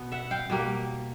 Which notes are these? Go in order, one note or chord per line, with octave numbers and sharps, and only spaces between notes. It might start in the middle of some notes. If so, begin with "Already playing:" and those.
Already playing: B2 B3
E5 F#5
F5 G5
B2 G3 A#3